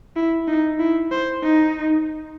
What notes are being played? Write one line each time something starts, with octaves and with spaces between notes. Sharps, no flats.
E4
D#4
E4
C5
D#4